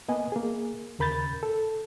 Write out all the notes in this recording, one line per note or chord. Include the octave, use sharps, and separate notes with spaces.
A#3 B3 D#5 G#5
A#3 G#4
D#2 C#3 A#4 B5 G6 A6
A4